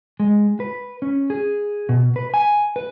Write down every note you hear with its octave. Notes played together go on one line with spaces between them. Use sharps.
G#3
B4
C#4
G#4
B2
B4
G#5
B4